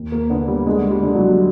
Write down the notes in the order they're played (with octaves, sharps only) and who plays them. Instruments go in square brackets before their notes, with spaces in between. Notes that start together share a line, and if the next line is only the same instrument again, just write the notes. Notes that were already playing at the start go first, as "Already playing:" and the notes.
Already playing: [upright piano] D#2
A#3
D3 B3
G3
D3 G#3
G3
D3
F#3